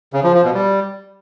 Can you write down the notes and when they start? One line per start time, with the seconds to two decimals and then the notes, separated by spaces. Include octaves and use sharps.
0.13 C#3
0.24 F3
0.34 F3
0.44 B2
0.54 G3